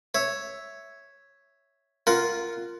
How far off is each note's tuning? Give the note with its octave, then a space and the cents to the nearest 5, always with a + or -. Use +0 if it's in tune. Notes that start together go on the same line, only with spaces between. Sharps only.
C#5 +0 E5 +0
F4 -5 A#4 +0 F#5 +10